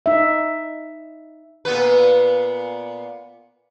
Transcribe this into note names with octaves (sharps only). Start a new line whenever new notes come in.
D#4 E5
A#2 B3 B4